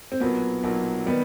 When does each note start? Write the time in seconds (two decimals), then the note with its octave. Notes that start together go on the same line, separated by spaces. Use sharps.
0.12 C4
0.20 B1 A#2 F#3 A#3 B3
0.63 B1 A#2 F#3 A#3
1.06 D#3 G3 B3